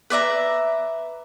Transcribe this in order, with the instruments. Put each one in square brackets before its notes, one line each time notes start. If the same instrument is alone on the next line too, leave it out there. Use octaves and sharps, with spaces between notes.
[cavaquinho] B4 D5 E5 A#5